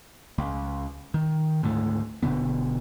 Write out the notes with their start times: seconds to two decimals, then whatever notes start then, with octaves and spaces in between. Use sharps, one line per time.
0.38 C#2
1.14 D#3
1.63 D2 G#2 A3
2.23 E1 B2 D3 B3